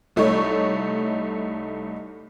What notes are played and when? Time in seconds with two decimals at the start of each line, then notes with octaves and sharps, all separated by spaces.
0.16 C2 A3 D#4 C#5